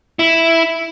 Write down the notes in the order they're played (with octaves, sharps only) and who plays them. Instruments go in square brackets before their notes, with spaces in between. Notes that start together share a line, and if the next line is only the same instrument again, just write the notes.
[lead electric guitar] E4